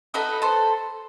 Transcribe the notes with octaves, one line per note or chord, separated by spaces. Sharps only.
D#4 F#4 A4 B4 D#5
A4 C5